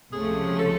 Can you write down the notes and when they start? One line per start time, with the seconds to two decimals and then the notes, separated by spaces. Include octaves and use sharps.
0.12 C#2 C3 F3 A3 C#4 G#4
0.59 A4